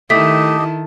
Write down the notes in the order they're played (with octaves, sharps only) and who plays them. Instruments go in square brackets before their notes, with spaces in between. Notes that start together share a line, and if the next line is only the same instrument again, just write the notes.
[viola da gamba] D#3 E4 [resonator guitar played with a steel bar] A3 [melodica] G4 D#5 [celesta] B6